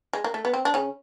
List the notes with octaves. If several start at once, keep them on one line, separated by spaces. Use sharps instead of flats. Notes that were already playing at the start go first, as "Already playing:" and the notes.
G#3
A#3
A3
B3
C4
D4
C#3 C#4